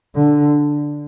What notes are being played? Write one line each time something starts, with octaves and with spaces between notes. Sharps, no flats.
D3